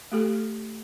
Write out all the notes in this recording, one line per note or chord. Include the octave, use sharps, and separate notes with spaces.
A3 G4 A4